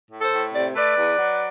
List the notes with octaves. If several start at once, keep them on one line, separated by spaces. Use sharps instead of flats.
A2
A4 C5
A2
C3 D5
A3 B4 D5
E2
F#3